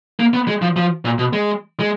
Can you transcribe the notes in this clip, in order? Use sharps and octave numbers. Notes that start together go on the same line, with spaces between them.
A#3
B3
G#3
F3
F3
A#2
B2
G#3
G#3